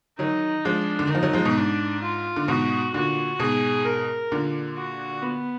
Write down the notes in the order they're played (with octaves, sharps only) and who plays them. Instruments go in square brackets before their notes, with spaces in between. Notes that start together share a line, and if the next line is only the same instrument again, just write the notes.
[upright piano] D#3 F#3 [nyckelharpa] D#4
[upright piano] F3 G#3 [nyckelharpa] D4
[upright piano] D3
D#3
[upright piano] F3 [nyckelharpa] D#4
[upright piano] D#3 F#3
F3 G#3
G#2 B2
[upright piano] G#2 [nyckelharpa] D4
[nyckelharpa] F4
[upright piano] D3
[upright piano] G#2 B2 [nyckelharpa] F#4
[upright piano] A#2 D3 [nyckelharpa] F#4
[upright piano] G#2 B2 [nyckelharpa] G#4
[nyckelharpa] A#4
[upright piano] A#2 D3
[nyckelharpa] F#4
B3